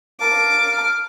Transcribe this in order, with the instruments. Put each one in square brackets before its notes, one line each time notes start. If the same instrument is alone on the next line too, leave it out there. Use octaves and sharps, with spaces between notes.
[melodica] A#4 F5 A5 [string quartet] D6
[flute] F6